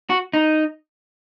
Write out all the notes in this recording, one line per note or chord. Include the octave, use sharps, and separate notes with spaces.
F#4
D#4